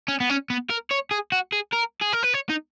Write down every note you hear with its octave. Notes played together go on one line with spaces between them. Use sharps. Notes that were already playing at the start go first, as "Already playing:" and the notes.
C#4
B3
C#4
B3
A#4
C#5
G#4
F#4
G#4
A#4
G#4
A#4
B4
C#5
D#4